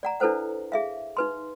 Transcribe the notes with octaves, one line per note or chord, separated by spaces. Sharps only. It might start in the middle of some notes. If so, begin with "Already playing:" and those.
D5 F#5 A#5
D4 E4 A4 B4 C5 F#5
G#4 E5 F5
D#4 B4 C6